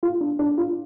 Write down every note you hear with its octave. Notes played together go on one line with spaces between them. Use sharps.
F4
D4
D4
F4